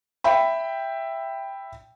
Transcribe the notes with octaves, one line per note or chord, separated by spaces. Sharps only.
E5 G5 B5